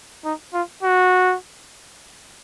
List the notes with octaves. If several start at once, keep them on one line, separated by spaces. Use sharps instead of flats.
D#4
F4
F#4